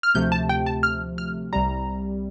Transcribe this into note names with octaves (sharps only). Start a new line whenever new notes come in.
F6
D2 C3 F3 A3 G6
A5
G5
A5
F6
F6
C2 C3 G3 A#5